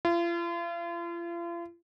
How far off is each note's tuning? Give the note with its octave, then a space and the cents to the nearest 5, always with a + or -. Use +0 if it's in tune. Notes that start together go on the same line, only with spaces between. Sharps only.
F4 -40